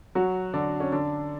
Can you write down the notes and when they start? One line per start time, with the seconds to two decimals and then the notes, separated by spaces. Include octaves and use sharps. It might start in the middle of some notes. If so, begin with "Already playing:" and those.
0.15 F#3 F#4
0.54 D3 D4
0.80 C#4
0.92 D3 D4